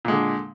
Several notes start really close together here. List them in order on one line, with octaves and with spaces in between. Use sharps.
A#2 G#3 D3